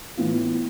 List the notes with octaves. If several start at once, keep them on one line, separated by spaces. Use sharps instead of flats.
A2 E3 B3 F4